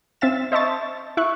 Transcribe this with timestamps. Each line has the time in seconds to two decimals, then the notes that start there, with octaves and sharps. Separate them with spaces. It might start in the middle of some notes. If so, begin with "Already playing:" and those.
0.21 C4 E5 F5 A6 E7
0.52 C5 D#5 E5 A5 C#6 A6
1.17 E4 E5 C#6 F#6